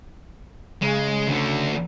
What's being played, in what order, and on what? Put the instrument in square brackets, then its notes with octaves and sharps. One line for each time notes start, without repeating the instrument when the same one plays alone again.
[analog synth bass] C#3 [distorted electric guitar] G#3
[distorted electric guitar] D2 D3